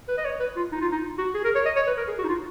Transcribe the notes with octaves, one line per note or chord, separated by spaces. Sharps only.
B4
D#5
C#5
B4
F4
D#4
F4
D#4
F#4
G#4
A#4
C#5
D#5
C#5
B4
A#4
G#4
F#4
D#4
F4